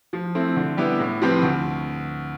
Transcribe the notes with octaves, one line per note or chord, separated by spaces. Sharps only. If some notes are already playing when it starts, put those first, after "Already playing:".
F3
A3 C4 E4
D3
G3 B3 E4 G4
A2
F3 C4 G4 B4
D2